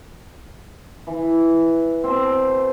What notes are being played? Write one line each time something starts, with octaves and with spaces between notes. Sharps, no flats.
E3
B2 C4